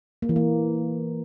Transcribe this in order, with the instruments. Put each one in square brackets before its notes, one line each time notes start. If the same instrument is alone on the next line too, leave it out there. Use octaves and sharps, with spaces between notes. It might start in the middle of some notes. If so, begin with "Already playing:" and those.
[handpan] A#3
E3
A#3